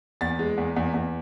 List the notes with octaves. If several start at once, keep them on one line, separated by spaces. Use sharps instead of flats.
E2 A6
G#3
E2
E2
E2